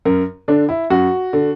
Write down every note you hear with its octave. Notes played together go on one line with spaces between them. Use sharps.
F#2 A#4
D3 D4
E4
F#2 F#4
D3